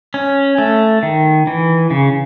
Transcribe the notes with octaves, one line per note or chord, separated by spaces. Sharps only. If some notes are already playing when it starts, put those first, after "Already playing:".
C#4
A3
D#3
E3
C#3